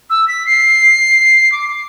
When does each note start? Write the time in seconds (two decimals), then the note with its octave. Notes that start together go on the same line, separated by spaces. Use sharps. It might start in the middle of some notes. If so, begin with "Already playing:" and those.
0.10 E6
0.28 B6
0.46 C7
1.52 D6